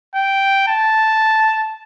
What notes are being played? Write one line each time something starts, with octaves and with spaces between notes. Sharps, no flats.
G5
A5